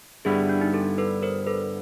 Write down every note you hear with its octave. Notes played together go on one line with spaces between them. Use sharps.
G2 D3 G3 B3 E4 G#4
D4
D#4
G4 A4
A4 B4
A#4 C5
A4 B4